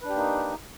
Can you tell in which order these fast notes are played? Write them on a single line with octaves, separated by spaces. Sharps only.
B4 D4 G4 A#3 D#4